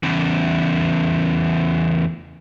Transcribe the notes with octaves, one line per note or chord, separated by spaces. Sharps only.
E2 C#3